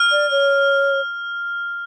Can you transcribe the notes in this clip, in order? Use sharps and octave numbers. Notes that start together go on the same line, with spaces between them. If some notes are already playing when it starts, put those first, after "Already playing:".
Already playing: F6
D5
C#5